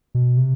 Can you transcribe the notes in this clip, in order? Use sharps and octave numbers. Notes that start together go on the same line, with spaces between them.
B2
C3